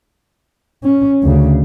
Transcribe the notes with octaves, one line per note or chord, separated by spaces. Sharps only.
C#4
D2 C#3